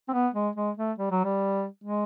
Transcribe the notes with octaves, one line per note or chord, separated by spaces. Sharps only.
C4
B3
G#3
G#3
A3
G3
F#3
G3
G#3